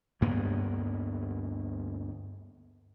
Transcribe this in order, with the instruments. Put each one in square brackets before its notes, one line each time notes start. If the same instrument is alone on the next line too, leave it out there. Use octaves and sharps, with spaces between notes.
[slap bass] D2 G2 A#3 B3